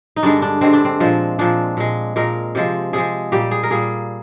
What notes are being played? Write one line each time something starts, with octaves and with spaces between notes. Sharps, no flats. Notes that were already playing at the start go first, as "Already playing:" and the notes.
D#4
G2 D3 G#3 D4
D4
G2 D3 G#3 C4
D4
C4
A#2 F3 G#3
A#2 F3 G#3 D4
A#2 G#3
A#2 G#3 A#4
C3 F3 G#3
C3 F3 G#3 G#4
A#2 G3 A#3 G4
G#4
A#4
A#2 G3 A#3 G#4